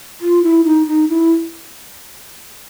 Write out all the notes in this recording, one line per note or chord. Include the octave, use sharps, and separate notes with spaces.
F4
E4
D#4
D#4
E4